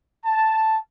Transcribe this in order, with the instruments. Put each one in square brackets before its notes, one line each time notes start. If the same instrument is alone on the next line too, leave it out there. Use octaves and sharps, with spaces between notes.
[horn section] A5